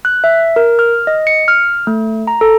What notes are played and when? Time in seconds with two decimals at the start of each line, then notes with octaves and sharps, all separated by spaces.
0.05 F#6
0.24 E5
0.56 A#4
0.79 F6
1.07 D#5
1.27 C#7
1.48 F6
1.87 A3
2.27 A#5
2.41 A4